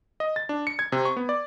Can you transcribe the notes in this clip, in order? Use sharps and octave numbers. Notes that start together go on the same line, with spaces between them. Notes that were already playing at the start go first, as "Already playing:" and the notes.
D#5
A6
D4
C#7
G#6
C3
C#6
B3
D5